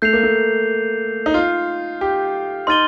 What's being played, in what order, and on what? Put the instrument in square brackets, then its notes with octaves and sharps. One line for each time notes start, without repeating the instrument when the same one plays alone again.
[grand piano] A3 [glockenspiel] G6 C7 F7
[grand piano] A#3
A3
D#4
F4
G4
[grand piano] D#4 [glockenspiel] C6 F6 A6 D#7 G7